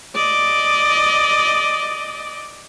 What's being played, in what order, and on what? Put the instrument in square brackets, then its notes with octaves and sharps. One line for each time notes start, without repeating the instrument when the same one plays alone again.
[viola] D5 D#5